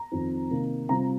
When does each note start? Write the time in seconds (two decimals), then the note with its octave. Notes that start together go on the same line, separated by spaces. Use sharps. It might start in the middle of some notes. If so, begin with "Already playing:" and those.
Already playing: A#5
0.12 F2 D#3 C4
0.51 C3 D#3 A#3 D#4
0.89 C3 G3 C4 F4 A#5